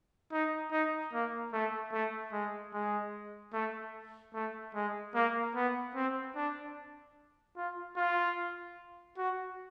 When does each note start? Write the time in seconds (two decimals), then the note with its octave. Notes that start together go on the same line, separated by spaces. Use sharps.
0.32 D#4
0.71 D#4
1.13 A#3
1.53 A3
1.92 A3
2.33 G#3
2.74 G#3
3.53 A3
4.34 A3
4.75 G#3
5.15 A#3
5.55 B3
5.95 C4
6.36 D4
7.57 F4
7.96 F4
9.18 F#4